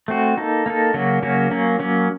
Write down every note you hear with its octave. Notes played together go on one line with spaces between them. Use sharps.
A3 C4 F#4
A#3 D#4 A4
A#3 D#4 A4
C#3 F#3 A#3 C#4 F#4
C#3 F#3 A#3 C#4 F#4
F#3 A#3 C#4
F#3 A#3 C#4